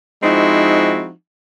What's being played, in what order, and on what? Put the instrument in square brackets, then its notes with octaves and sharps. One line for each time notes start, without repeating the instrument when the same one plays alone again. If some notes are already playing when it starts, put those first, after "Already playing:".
[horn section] F3 G#3 C4 D#4 E4 F#4